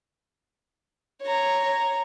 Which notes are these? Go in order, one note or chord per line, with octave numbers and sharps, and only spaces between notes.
C#5 A#5